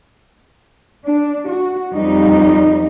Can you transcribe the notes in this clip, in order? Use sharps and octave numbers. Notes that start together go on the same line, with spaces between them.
D4
F#4
F2 G3 D#4